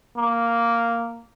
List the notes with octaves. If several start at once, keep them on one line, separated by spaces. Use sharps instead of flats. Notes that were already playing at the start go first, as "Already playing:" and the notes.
A#3